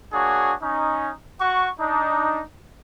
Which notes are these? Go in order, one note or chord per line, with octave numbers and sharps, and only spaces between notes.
A#3 D4 F#4 G#4 C#5
C#4 D#4
F#4 C#6
D4 D#4